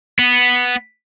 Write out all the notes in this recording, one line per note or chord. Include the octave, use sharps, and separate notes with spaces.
B3